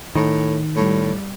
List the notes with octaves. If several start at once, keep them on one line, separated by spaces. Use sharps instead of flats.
A2 D#3
A2 G3